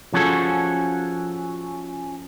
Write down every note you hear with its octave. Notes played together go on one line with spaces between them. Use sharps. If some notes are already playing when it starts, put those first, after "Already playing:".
F3 C#4 F#4 G#4 A4